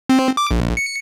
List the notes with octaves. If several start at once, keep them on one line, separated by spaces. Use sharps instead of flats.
C4
D6
A#1
C#7